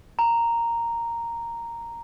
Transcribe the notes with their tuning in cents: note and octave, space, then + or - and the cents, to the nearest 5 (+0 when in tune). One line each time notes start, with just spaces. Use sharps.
A#5 -5